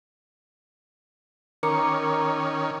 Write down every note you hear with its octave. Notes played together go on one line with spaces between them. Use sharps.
D#3 C#4 A#4 A#5 D6 C#7